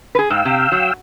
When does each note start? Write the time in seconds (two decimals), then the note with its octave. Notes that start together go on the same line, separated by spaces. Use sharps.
0.15 G#4 B4
0.30 G#2 F5 G5 E6
0.45 C3
0.72 F#3